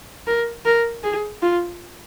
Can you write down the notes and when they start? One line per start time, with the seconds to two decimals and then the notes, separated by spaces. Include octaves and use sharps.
0.27 A#4
0.65 A#4
1.04 G#4
1.42 F4